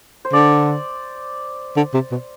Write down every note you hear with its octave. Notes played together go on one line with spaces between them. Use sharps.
C5
D3 D5
D3
C3
B2